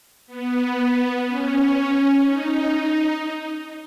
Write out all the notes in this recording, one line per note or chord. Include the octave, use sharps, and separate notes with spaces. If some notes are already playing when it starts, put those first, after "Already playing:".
B3
C#4
D#4